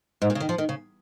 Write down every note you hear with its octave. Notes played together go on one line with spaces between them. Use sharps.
G#2
A#2
C#3
D#3
F3
D#3
C#3